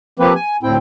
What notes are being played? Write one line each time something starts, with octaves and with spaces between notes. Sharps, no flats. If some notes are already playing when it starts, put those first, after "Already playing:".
F3 A#3 C4 G4 B4
G#5
D2 A2 C4 E4 G5